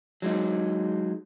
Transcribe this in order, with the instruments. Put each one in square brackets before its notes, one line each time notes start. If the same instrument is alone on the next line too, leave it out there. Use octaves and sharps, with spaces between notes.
[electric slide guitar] F#3 G#3 D#4